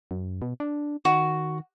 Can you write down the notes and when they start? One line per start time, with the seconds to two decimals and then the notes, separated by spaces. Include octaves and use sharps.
0.11 F#2
0.42 B2
0.60 D4
1.05 D#3 F#4